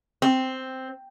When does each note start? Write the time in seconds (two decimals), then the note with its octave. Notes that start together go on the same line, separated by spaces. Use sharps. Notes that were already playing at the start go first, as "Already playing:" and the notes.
0.22 C4